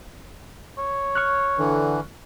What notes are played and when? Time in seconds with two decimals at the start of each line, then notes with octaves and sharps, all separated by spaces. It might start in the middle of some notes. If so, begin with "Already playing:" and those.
0.78 C#5
1.15 C#6 F6 F#6
1.58 D3 E3